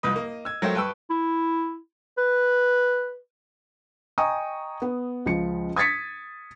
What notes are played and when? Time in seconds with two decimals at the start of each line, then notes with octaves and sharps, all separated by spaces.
0.03 C2 F2 B4 D#5
0.16 A#3
0.45 E6 G#6
0.62 F#3 A3 A#4 C5 G5
0.75 G2 B4 G5 A5 C#6 E6
1.10 E4
2.18 B4
4.18 D#5 G5 G#5 A#5 C#6 D#6
4.82 B3
5.26 C#2 F3 C#7
5.76 D#6 G#6 A6 B6 C#7